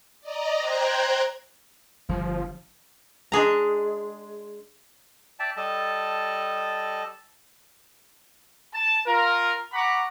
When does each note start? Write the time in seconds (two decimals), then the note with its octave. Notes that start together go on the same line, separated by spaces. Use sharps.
0.21 D5 D#5 A#5
0.58 C5 G5 A#5 F#6 G#6
2.09 G1 G2 F3
3.32 G#3 D4 G#4 A#5
5.39 D5 E5 G5 A5
5.57 G3 A4 D#5 A5
8.74 A5
9.07 F4 A#4
9.73 F#5 A#5 B5 C#6 D6